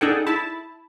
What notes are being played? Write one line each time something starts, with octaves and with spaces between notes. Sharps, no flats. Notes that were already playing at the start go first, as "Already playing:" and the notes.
D4 D#4 G#4 A4 F#5 G5
E4 A5 B5